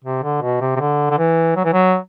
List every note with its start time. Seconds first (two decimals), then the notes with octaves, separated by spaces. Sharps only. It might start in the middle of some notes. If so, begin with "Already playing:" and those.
0.04 C3
0.23 D3
0.42 B2
0.61 C3
0.76 C3
0.80 D3
1.10 D3
1.18 E3
1.56 F#3
1.65 E3
1.73 F#3